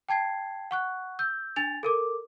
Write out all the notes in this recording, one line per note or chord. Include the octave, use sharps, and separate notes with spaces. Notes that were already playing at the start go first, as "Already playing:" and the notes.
G5 A5 G#6 C7
F#5 C#6 F#6
E6 G6
D4 G#5 A6 F7
A4 A#4 D6